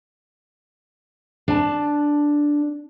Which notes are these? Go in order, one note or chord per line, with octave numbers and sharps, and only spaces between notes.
D4 A5